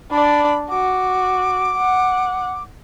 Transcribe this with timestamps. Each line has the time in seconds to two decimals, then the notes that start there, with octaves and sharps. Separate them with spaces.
0.11 D4 D5 B5
0.70 F#4 D6
1.78 F#5